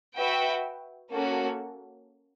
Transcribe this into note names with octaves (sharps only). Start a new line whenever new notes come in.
F#4 B4 E5 G5
A#3 C#4 F#4 A4